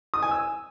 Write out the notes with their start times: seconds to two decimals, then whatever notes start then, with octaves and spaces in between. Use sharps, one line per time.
0.14 D#6
0.22 G#5
0.31 E6